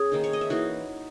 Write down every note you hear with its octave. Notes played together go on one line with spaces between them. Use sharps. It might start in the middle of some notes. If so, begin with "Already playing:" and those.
Already playing: C#4 G#4 G#5
D#3 A#3 D#4
C#5
D#5
E5
E3 A#3 D#4 F#4 F#5